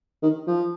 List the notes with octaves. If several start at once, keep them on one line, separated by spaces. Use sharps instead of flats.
D#3
F3